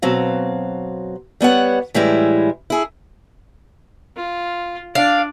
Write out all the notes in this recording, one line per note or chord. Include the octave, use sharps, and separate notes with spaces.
B2 F#3 C4 F5
G3 B3 C#5 F#5
A2 E3 G3 G#3 E4
E4 G#4
F4
D4 D5 F5